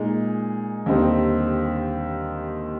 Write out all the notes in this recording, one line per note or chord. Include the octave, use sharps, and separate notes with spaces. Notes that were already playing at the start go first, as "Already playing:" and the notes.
Already playing: A#2 G#3 D#4 G#4
D#2 D3 G3 C4 D#4